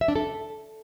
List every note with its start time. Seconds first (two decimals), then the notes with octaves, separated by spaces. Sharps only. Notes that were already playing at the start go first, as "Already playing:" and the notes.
0.01 E5
0.08 D4
0.16 A4